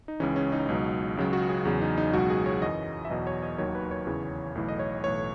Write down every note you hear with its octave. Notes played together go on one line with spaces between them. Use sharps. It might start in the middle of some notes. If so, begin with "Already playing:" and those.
D#4
C#2 C#3 E3 C#4
C#4
D#4
C#2 B2 F#3
C#2 C#3 F#3
F#4
G#4
E2 C#3 F#3
D#4
D#4
C#2 B2 F#3 F#4
G#4
C#5
F#2 E3 D#5
E5
E2 B2 F#3 D#5
C#5
D#5
D#2 D#3 F#3 C#5
B4
C#5
E2 C#3 E3
B1 A2 E3
D#5
C#5
B1 A2 E3 C#5